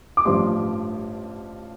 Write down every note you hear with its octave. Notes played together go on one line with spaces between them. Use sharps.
D6
A1 G2 F3 C6